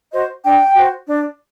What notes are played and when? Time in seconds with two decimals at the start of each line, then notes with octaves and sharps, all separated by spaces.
0.12 F#4 C5 D#5
0.43 D4 G5
0.75 F#4 C5
1.07 D4